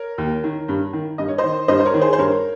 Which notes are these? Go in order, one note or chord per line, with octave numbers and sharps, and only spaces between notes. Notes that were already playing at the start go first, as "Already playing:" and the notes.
Already playing: A#4 C#5
D#2
D#3
G2
D#3
G2 D#5
C#5
C5 D#5
D#3
G2 C5 D#5
C5
A#4 C#5
D#3
G#4 C5
C5
G2 A#4 C#5